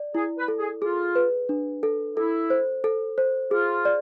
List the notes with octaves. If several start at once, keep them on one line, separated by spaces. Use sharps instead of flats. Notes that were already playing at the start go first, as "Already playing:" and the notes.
Already playing: D5
E4 G#4
B4
A4
G#4
F4 G#4
B4
D4
A4
E4 A4
C5
A4
C5
F4 G#4
D5